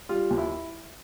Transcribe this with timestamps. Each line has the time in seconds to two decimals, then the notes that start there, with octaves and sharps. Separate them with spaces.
0.09 G3 F4
0.30 D#2
0.38 E4